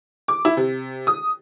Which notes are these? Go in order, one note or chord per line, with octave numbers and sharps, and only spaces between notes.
D6
E4
C3
D#6